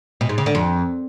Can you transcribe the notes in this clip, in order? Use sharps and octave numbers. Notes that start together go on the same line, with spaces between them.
B2
G#2
C#3
D3
F2